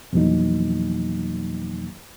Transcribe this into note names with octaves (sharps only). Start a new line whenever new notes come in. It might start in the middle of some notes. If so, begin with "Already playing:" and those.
F2 B2 E3 F#3 A#3 D#4